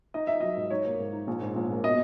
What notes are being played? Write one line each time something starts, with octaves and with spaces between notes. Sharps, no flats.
D#4 D#5
D#4 E5
F#3 D#5
G#2
D#4 C#5
A#3
G#2
D#4
A#1
G#2
A#1
A#3
B2 D#5